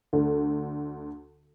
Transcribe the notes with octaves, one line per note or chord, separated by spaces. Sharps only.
D2 D3